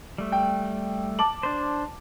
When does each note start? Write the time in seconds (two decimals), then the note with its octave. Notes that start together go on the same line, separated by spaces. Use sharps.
0.18 G3 A3
0.32 G5
1.19 A5 D6 F#7
1.43 D4 C5